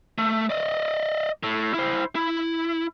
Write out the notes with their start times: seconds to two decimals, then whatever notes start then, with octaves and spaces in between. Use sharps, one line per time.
0.18 A3
0.50 D5 D#5
1.43 A2
1.74 E4 C5
2.15 E4